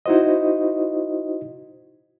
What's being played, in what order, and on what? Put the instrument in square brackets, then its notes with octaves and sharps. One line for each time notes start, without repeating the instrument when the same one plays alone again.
[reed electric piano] D#4 E4 F#4 C5 D#5